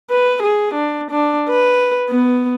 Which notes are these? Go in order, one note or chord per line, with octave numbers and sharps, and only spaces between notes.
B4
G#4
D4
D4
B4
B3